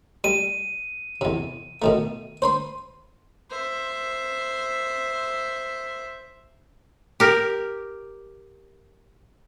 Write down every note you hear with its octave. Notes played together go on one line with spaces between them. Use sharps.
G3 D#7
E2 C3
B2 D#3 A3
C5 B5 C6
C5 E5
G4 A#4